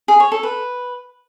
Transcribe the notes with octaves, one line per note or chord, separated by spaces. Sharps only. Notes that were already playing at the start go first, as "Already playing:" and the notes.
G#4
C#5
A4
B4